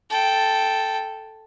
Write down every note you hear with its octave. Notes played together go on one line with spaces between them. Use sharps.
A4 G5